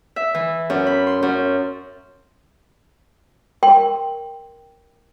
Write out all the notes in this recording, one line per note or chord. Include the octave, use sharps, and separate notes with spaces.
E5
E3
F#2
B5
C6
F#2
A#4 G5 C6